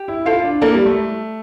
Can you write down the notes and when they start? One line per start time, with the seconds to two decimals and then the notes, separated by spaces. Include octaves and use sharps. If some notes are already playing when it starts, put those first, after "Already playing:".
Already playing: G4
0.08 E4
0.26 E4 F4 A4 C5 F5
0.44 D4
0.61 A#3 E4 A4 D5
0.74 G3
0.86 A3